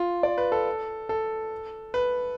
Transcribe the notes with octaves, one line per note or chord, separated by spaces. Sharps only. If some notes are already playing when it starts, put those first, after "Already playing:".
Already playing: F4
D5
B4
A4
A4
B4